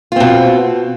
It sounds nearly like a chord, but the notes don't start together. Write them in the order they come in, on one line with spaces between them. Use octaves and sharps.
F4 C4 B2